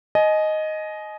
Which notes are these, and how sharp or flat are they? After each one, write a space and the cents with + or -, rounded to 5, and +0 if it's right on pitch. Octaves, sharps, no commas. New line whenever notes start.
D#5 +0 G#5 +35